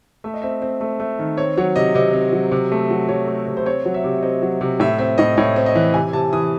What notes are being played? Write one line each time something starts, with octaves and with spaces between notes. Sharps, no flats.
A3 E5
D#5
C4 E5
C4
A3
A3
D#3
C4 C#5
F#3 C#5
C3 D#5
C3 D#5
C4
F#3
C3
A3
F#3
F#3 C#5
A3
C3
C5
C4 C#5
F#3
E5
C3
C4 D#5
F#3
C3
A2 E5
C4 E5
A2 D#5
A2 C#5
C4
D#5
E3
C3 G#5
C3 A5
E3 D#6